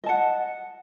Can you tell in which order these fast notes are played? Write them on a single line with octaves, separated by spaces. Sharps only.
D#5 A5 F#5